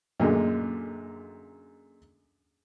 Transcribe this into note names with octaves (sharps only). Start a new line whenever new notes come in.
F#2 A#2 D3 G#3